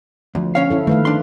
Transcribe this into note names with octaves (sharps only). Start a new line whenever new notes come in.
D2 D3 F3
C#4 C#5 F5
E4 A4
D#3 A3 B4 F5
D4 C6